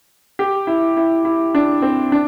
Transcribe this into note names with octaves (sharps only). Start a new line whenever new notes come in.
G4
E4
E4
E4
D4
C4
D4